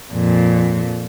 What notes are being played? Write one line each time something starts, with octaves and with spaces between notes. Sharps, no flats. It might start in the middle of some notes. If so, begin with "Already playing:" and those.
F2 A#2